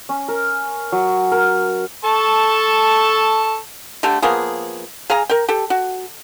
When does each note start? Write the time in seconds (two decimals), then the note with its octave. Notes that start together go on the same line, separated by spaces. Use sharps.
0.09 C#4
0.28 A#4
0.92 F#3
1.32 A#4
2.04 A4 A5 C#6
4.03 D3 A3 G4 A5
4.22 F3 A#3 B3 G#4
5.10 G#4 F5 G#5 A#5
5.29 A#4 G5
5.49 G4 A4
5.70 F#4